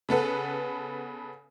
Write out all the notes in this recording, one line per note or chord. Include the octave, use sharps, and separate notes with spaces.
C#3 B3 A4 B4